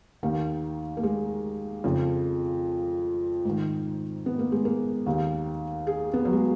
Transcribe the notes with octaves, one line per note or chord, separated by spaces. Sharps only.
D#2 D#3 A#3
A#3
G#3
F2 C#3 F3
G#2 D#3
B3
A#3
G#3
A#3
D#2 D#3
G#4
B3
F#3
G#3